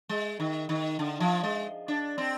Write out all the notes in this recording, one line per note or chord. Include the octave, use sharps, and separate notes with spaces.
G#3
D#3
D#3
D3
F3
G#3
D4
C4